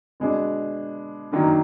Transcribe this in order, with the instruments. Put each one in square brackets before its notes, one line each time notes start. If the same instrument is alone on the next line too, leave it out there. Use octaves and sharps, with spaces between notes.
[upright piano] B2 G#3 D4
F#2 D#3 F#3 A#3 D4